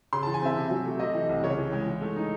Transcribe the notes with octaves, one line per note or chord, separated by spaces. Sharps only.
C#3 C6
E3 A5
G#5
C4 E5
C3
F#3
A3
C3 D#5
E3
C2
C#3 C#5
E3
G#3
E3
A3
D#4